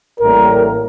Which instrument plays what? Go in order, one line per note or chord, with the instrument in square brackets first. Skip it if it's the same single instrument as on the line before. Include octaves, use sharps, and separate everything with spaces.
[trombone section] A1 A2 G3 A#3 A#4